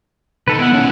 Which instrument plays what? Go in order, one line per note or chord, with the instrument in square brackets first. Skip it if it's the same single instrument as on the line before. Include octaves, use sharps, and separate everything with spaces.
[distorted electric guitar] D#3 [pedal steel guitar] A4 B4
[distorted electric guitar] B3 [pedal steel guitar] E4 F#5
[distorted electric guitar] D#2 C#4